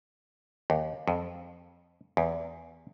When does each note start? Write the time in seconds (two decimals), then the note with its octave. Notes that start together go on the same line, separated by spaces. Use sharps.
0.70 D#2
1.08 F2
2.17 E2